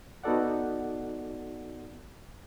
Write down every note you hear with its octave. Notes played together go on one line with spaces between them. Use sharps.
B3 D#4 F#4 A4 D5 F#5